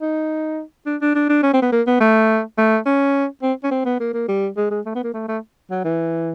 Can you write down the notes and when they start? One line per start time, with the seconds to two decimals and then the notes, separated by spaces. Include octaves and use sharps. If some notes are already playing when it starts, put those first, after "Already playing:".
0.01 D#4
0.86 D4
1.01 D4
1.15 D4
1.29 D4
1.43 C#4
1.53 C4
1.62 B3
1.72 A#3
1.87 B3
2.00 A3
2.58 A3
2.86 C#4
3.42 C4
3.64 C#4
3.71 C4
3.85 B3
4.00 A#3
4.14 A#3
4.28 G3
4.57 G#3
4.70 G#3
4.86 A3
4.95 B3
5.04 A#3
5.14 A3
5.28 A3
5.71 F#3
5.84 E3